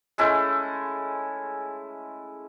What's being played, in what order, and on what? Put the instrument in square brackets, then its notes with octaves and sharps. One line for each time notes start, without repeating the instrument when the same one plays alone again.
[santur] G#3 A3 C#4 E4